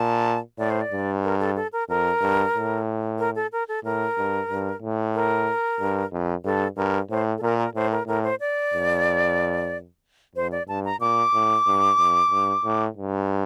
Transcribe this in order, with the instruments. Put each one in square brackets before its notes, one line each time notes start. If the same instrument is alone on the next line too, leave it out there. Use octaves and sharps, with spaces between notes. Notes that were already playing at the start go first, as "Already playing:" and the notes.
Already playing: [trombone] A#2 [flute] A5
[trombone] A2 [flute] D5
[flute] C5
D5
[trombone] G2
[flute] A#4
A4
A4
A#4
[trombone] F2 [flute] A#4
[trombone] G2
A2
[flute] A#4
A4
A#4
A4
[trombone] A2 [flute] A#4
[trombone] G2
G2
A2
[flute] A#4
[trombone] G2
F2
[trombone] G2 [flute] A4
[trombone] G2 [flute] A#4
[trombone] A2 [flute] C5
[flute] A4
[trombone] A#2 [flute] A#4
[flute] A#4
[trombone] A2 [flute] C5
[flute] A#4
[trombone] A2 [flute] A#4
[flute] C5
D5
[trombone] F2
[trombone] F2 [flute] C5
[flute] D5
[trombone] G2 [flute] A5
[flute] A#5
[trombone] A#2 [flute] D6
[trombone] A2
G2
F2
G2
A2
G2